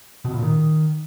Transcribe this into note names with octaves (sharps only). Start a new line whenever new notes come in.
B2
A#2
D#3